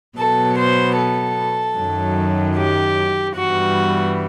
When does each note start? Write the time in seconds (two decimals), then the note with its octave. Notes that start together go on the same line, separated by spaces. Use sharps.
0.18 B2 F#3 B3 A4
0.58 C5
0.97 A4
1.76 F#2 D#3 F#3
2.56 G4
3.34 G2 E3 G3 B3 F#4